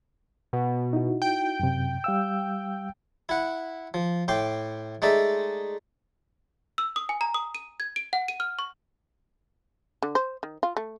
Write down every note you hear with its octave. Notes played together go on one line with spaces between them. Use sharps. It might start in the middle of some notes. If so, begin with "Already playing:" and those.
B2
D#4 E4 F#4
G5
F#2 C3
G3 F5 E6
E4 F#5
F3
A2 G5 C6 D6
G#3 A3 D#4 D5 E5
E6
D#6
G#5
A#5
D#6
D#7
G#6
D7
F#5
D#7
F6
C#6
D3
C5
D#3
F4
A3